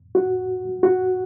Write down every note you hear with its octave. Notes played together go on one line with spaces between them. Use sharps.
F#4
F#4